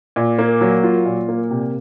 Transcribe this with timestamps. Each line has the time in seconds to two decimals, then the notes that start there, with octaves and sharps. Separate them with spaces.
0.16 A#2
0.39 A#3
0.61 F#3
0.83 F4
1.06 A#2
1.29 A#3
1.51 C3